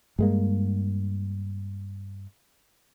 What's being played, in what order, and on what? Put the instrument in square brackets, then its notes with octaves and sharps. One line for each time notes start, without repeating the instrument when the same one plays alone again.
[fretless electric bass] G2 G#3 A#3